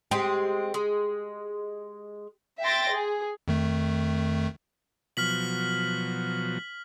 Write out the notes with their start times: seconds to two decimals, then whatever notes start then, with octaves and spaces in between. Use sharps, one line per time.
0.11 G#3 C4 G4
0.74 G#3
2.62 E5 G5 C6 A6 A#6 D7
2.91 G#4
3.48 F2 D#3 A3
5.17 B2 F3 F#3 F6 B6 F#7